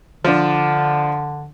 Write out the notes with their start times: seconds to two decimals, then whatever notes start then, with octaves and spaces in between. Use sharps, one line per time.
0.24 D3 F3 D4